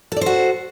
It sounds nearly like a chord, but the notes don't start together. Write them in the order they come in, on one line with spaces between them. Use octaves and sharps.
A4 D5 C5 F#4